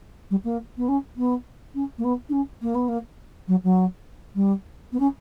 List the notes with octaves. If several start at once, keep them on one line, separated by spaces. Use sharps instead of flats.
G3
A#3
B3
C#4
B3
C#4
A#3
B3
D4
C#4
A#3
B3
A#3
F#3
F#3
G3
B3
C#4